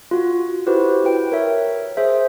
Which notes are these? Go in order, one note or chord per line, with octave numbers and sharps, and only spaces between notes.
F4 F#4
E4 F#4 G4 B4 C5
E4 B4 G5
A#4 C#5 E5
G#4 C5 E5